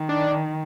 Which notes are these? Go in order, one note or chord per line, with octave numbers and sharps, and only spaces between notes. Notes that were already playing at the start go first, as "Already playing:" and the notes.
Already playing: D#3
D4